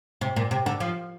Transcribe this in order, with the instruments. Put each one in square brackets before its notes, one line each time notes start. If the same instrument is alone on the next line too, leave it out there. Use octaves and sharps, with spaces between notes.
[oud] C3
A#2
C3
D3
F3